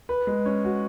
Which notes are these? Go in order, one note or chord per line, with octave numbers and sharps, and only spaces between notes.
B4
G#3
C#4
F#4